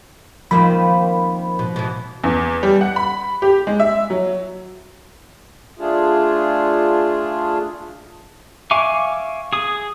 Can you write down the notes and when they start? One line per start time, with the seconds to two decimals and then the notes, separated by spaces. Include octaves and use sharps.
0.51 D#3 F3 A#3 C4 B5
1.59 B2
1.76 B2 E3
2.24 E2
2.63 G3
2.81 F#5
2.96 B5
3.42 G4
3.67 G#3
3.80 E5
4.10 F#3
5.79 A3 D4 F4 G#4
8.71 E5 F5 G#5 C#6 D6
9.53 G#4 D#6